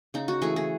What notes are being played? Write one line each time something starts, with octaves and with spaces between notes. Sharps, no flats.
C#3 D#4
F#4
E3 A3 G#4
G#4